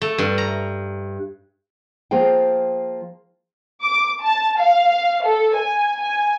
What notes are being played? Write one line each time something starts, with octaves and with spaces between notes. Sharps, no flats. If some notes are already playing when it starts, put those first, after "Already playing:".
A3
G2
A#5
F3 A#3 F4 G#4 G5
D6
A5
F5
A4
G#5
G#5